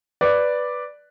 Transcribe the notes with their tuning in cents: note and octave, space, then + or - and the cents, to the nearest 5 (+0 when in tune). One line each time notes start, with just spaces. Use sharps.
B4 +0 D5 +0